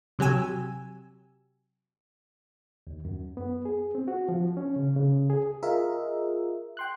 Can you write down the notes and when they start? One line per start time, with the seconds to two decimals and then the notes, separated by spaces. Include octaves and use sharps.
0.19 C3 F#3 G4 G#5 E6
2.87 D#2
3.05 F#2
3.37 B3
3.65 G#4
3.95 C4
4.08 F#4
4.29 F3
4.57 C#4
4.76 C#3
4.96 C#3
5.30 G#4
5.63 F4 G#4 A#4 D#5 E5
6.77 G5 C6 F#6